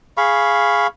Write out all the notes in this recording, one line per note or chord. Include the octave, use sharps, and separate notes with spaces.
G#4 F5 B5 C#6